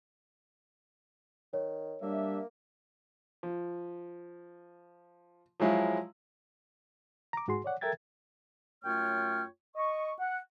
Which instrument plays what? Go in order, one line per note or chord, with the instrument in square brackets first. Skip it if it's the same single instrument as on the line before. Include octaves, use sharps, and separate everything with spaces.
[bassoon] D#3 [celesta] C#5
[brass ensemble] G3 D4 E5 [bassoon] A#3
[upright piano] F3
F3 F#3 G#3 E4 F4
[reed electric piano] A#5 D6
G#2 F#4 G#4 C6
C#5 D5 F#5
A4 A#4 E5 G5 G#6 A6
[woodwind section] F#2 A3 F4 C#5 G5 F6
D#5 C#6
F#5